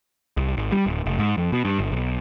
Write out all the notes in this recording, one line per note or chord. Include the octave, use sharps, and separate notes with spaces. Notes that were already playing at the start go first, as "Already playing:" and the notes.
C2
G#1
G3
D1
F1
G#2
F2
B2
G2
G1
B1